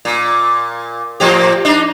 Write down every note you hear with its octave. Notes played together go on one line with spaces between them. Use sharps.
A#2
A2 F3 G4
D4 D#4